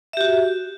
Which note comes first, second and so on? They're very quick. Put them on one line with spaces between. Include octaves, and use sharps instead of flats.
E5 G4 F#4